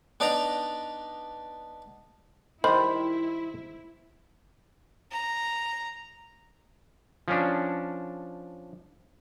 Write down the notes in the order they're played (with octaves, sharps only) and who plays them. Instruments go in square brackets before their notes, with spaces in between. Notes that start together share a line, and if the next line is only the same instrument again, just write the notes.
[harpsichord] B3 D4 D#4 D5 A#5
[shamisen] D#3 G3 [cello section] E4 [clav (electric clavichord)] C5 [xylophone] B5
[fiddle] A#5
[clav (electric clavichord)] F3 C#4 D4